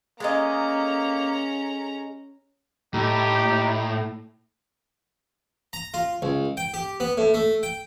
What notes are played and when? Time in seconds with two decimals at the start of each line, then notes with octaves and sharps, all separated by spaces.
0.20 G#3 A#3 C#4 A4 D#5 A#5
2.94 A2 D#4 G4
5.73 A#5
5.94 F4
6.22 C#2
6.57 G5
6.74 G4
7.00 B3
7.17 A2
7.34 A3
7.63 G5